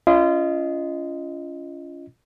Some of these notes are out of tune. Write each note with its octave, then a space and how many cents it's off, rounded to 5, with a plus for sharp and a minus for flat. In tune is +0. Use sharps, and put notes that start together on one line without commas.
C#4 +25 F4 -30 D#5 +0